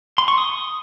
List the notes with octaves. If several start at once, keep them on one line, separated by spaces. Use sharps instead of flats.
C6
C#6
D#6